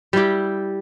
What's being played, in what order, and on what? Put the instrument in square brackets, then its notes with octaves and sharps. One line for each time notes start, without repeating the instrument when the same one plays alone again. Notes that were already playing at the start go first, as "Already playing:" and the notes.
[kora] G3 E4 G4